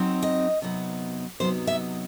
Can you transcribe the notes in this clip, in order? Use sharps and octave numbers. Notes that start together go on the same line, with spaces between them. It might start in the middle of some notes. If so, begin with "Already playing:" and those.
Already playing: F#3 C4 D#4
D#5
C3 F#3 B3 D#4
C3 F#3 B3 D#4 C5
E5